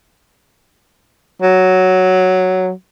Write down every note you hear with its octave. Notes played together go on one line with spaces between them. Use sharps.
F#3